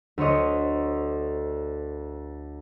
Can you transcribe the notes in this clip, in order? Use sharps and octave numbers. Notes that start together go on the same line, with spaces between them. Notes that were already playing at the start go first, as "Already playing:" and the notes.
D2 C5 C#5 D#5